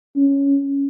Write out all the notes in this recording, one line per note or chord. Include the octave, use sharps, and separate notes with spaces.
C#4